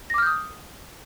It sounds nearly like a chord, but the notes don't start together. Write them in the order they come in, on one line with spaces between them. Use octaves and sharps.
A#6 D6 F6 G6 D#6